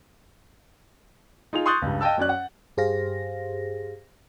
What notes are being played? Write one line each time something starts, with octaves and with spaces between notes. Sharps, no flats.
D#4 F4 G#4 F7
C6 C#6 D#6 F#6 G6 A6
C#2 G2
D#5 F5 G5 A5 E6
F#2 C#4 D5 F#6
F#5
G2 G4 G#4 C5 F5 A#6